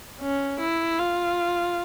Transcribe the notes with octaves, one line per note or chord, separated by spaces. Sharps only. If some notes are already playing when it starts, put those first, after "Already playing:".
C#4
E4
F4